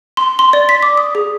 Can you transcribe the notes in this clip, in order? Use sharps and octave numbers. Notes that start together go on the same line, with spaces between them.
C6
C6
D5
B6
D6
D#6
G#4